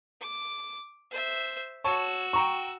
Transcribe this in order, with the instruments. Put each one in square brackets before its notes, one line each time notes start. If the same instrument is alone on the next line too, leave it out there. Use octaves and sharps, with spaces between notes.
[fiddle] D6
C5 E5
[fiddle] F#4 E6 [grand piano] C#5 A5 C#6
[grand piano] G5 A#5 C#6